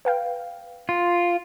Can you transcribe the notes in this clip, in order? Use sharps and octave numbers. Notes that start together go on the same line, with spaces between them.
B4 F5 G5
F4